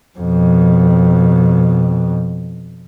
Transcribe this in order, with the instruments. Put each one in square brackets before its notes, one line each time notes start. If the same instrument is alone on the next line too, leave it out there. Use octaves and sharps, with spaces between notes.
[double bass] F2 B2